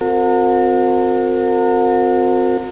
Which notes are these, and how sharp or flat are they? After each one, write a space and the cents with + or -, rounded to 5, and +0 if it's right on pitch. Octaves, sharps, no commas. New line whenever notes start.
C4 -10 F#4 -40 A#4 -40